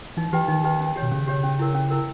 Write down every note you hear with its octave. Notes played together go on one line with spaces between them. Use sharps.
E3 D#4
E3 G4 B4 G5 B5
D#3 D#4
G4 B4 G5 B5
C#4
G4 C#5
B2
C#3 C#4
G4 C#5
C#4
E4 A#4
C#4
E4 A#4